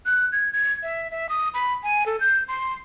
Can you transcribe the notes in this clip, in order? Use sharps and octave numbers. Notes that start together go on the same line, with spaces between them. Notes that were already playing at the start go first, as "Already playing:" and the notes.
F#6
G#6
G#6
E5
E5
D#6
B5
G#5
A4
G6
C6